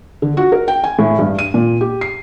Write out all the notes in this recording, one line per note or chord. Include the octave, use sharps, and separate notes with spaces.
D3
F#4
A#4
G5
G#5
A2
G2
D#7
A#2
G4
C7